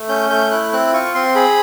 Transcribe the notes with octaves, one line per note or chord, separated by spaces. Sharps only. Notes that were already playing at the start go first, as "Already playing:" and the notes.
Already playing: A3
C#4 G6
A3 G6
E4 F#6
C4 F#6
F4 C#6
C4 C6
G#4 B5